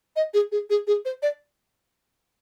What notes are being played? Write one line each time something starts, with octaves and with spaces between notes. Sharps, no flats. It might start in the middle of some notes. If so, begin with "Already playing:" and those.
D#5
G#4
G#4
G#4
G#4
C5
D5